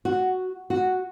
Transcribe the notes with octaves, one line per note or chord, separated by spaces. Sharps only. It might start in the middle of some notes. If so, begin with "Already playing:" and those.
F#4
F#4